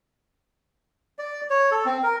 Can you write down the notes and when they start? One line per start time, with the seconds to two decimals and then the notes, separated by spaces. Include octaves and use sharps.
1.19 D5
1.50 C#5
1.71 A4
1.85 C4
2.03 A#4